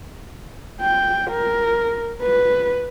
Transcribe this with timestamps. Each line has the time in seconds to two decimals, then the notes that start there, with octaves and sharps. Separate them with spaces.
0.81 G5
1.31 A#4
2.23 B4